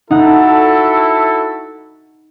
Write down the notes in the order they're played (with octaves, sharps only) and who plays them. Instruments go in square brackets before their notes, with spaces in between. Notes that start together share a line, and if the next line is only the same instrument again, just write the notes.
[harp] D#4 F#5 [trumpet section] E4 F#4 A4